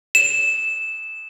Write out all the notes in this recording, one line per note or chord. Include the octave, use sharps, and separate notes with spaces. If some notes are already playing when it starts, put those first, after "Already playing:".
E7